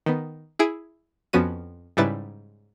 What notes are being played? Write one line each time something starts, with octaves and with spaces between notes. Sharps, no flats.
D#3 B3
E4 G#4 G#6 D7
F2 F3 B3 C#4 F#4 D#7
G#2 C#3 G3 E4 B4 A6